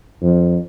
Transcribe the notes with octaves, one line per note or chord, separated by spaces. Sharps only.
F2